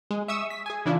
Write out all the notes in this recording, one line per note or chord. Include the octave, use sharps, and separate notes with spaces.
G#3
E5 C#6 D#6 E6
B6
G#4 G#5
C#3 E3 D4 E4 F4